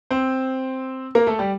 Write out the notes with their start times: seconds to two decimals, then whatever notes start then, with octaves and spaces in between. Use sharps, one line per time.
0.11 C4 C5
1.15 A#3 A#4
1.27 A3 A4
1.39 G3 G4